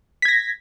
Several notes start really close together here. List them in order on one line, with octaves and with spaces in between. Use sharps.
B6 G#6 A#6